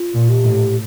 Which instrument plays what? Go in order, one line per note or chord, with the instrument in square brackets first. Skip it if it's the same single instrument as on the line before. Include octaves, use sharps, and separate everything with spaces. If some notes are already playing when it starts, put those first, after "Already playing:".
Already playing: [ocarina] F4
[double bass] A#2
[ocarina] G4
[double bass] A2